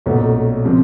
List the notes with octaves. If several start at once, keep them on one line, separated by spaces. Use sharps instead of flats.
B1 A#2 F#3 A3 C#4
C#3 F3 G#3 C4